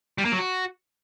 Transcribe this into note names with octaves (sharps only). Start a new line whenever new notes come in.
G3
A#3
F#3
F#4